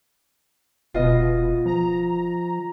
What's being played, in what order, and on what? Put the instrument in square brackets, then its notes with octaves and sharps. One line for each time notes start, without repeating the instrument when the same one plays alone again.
[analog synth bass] F1 [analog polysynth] B2 B3 [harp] F4 D#5
[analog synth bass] F3 [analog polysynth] A#5